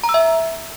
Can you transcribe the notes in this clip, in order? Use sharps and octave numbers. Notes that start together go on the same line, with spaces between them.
A#5
E6
E5